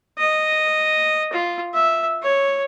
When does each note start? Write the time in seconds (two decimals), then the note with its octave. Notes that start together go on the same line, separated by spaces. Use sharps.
0.18 D#5
1.33 F4
1.74 E5
2.22 C#5